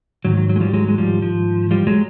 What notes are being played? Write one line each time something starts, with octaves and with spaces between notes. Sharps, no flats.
G#2 D#3 F#3
F#3
F#3
G#3
F3 G3
F#3 G#3
G#3
F3 G3
F3
F3 G3
F#3 G#3